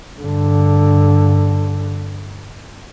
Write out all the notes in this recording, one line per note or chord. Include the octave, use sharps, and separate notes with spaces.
G2 D3